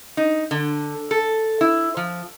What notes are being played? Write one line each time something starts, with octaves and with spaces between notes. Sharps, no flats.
D#4
D3
A4
E4
F3